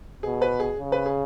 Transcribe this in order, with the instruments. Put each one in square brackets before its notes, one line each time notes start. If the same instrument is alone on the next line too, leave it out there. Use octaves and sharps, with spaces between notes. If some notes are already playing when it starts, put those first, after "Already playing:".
[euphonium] B2 [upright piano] G#4
[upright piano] B4
G#4
[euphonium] C#3
[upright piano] B4
G#4